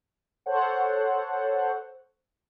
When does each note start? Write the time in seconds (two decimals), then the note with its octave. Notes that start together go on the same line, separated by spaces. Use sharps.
0.46 A4 C5 C#5 F#5